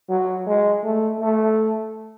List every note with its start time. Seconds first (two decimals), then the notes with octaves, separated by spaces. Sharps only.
0.09 F#3
0.46 G#3
0.84 A3
1.21 A3